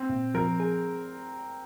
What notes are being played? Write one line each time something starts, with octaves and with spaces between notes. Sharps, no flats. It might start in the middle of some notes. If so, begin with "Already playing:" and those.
Already playing: C4
A#2
F3 A#4
G#4